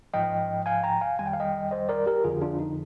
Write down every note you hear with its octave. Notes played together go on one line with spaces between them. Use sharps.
G#2 F3 D#5 G5
F5 G#5
G5 A#5
F5 G#5
F2 D#3 G3 G#5
G5
F5
D#5 G5
C5 D#5
A#4 D5
G4 A#4
F2 D3 F3 F4 G#4
D4 F4
D#4